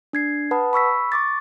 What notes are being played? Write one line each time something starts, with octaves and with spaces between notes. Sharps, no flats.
D4 G#6 C7
B4 F#5 A5 B5 D#6
B5 C#6 E6 B6
C#6 D6 A6